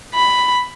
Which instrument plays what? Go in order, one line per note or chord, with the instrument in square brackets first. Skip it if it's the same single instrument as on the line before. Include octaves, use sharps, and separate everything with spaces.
[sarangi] B5